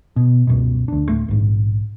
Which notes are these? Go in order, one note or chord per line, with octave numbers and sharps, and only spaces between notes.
B2
C#2 F#2 B2
D2 D4
D1 A3
A#1 G#2